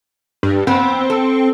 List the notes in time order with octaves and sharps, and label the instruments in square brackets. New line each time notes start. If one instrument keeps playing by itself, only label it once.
[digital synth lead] G2
[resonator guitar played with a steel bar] F2 B3 [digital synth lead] C4
[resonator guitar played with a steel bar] A4